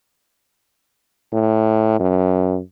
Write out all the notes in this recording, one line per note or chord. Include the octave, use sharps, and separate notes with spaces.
A2
F#2